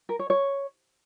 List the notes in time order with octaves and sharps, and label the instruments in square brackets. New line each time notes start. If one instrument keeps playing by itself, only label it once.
[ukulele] A#4
C#5
C#5